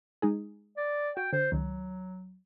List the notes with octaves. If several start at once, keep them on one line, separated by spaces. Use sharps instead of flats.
G#3 D#4 G#4
D5
F#4 G5
D3 C5
C#2 D#3 F#3